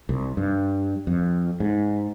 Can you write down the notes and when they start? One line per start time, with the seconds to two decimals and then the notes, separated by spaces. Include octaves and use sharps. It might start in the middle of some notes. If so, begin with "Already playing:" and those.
0.09 C2
0.37 G2
1.07 F2
1.60 G#2